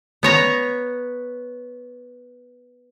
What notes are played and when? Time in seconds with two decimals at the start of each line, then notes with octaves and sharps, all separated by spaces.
0.23 B3 C#5 A#5